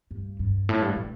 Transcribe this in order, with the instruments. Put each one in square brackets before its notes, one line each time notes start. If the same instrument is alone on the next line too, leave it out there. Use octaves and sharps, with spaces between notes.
[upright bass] G2
G2
A2
G2
A2